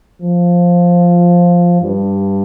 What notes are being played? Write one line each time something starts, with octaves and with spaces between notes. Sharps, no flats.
F3
G2